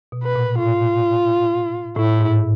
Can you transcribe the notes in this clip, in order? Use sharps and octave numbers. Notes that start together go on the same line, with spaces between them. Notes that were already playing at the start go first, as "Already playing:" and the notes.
B2
B4
A#2
A2 F4
A2 E4
G#2